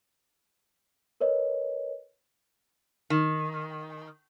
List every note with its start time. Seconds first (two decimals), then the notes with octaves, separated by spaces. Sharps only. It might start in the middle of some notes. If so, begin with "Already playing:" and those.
1.21 A#4 B4 C#5 D#5
3.10 D#3